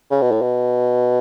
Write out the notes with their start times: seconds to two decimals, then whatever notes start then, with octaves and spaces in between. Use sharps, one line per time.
0.11 C#3
0.22 B2
0.32 A2
0.42 B2